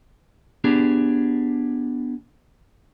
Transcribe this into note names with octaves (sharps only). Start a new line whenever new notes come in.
B3 D4 G4 G#4